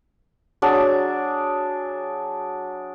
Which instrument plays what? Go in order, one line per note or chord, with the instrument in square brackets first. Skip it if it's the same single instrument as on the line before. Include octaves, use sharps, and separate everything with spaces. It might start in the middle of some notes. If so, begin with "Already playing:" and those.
[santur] F#3 D4 G#4